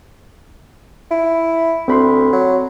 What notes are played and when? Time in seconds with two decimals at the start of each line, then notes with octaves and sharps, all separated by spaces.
1.10 E4
1.88 D2 C4 B5 C6
2.32 F#3